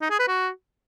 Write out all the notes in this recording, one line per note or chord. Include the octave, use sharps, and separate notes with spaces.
D#4
G#4
B4
F#4